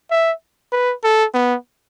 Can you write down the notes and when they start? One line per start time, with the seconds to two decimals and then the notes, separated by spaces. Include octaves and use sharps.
0.11 E5
0.72 B4
1.04 A4
1.34 B3